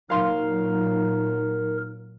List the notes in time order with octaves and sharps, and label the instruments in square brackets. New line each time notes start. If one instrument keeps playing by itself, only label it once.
[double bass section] A#2 F#3 [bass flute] D#4 [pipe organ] A#4 [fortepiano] F5 C6